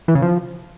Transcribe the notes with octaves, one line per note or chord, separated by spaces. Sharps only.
E3
C#3
F3